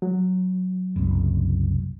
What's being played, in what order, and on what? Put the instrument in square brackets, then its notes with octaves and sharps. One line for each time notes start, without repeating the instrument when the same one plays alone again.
[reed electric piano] F#3
[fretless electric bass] F#1 C2